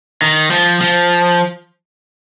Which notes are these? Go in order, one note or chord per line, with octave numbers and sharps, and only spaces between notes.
D#3
F3
F3